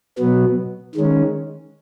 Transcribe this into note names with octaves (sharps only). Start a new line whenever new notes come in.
B2 F#3 B3
D#3 G#3 C#4